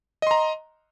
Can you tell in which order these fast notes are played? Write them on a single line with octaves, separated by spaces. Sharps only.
D#5 C6 A#5